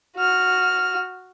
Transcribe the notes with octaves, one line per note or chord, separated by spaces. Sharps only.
F#4 F6